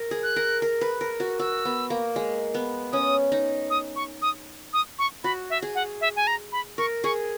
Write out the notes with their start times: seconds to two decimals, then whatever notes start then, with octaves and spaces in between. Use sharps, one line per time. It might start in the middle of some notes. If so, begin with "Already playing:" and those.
Already playing: A#4
0.11 G#4
0.23 F#6
0.36 A#4
0.62 A#4
0.81 B4
1.01 A#4
1.20 F#4
1.39 F#4 E6
1.65 B3
1.90 A#3
2.16 G#3
2.54 B3
2.93 C#4 D#6
3.32 D#4
3.70 D#6
3.96 C#6
4.22 D#6
4.73 D#6
4.99 C#6
5.24 F#4 B5
5.50 E5
5.62 G#4
5.75 F#5
6.01 E5
6.16 G#5
6.27 A#5
6.52 B5
6.78 A#4 C#6
7.04 G#4 C#6